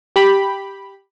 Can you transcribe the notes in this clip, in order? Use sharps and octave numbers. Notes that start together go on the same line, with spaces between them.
G4 B5